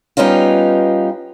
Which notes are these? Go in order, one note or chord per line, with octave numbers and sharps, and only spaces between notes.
G3 B3 C#4 D#4 F4